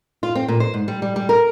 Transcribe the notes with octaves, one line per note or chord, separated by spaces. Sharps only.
F4
C4
A#2
C5
G#2
G3
G3
G3
A#4